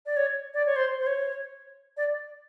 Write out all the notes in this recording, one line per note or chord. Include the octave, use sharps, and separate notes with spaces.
D5
C#5
D5
C#5
C5
C5
C#5
D5